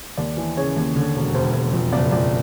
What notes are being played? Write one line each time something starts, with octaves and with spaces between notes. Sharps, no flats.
D#2 D5
E3
C#3 C#5
D#2
D3
E1
E1 C5
E1
F2
F#1 D5
F2 D5